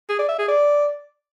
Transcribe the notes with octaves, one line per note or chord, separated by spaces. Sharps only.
G#4
D5
E5
G#4
D5